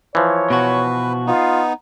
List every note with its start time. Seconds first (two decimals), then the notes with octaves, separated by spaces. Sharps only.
0.15 E3 F3 C#5
0.50 B2 F#4 B4
1.27 B3 D#4 F4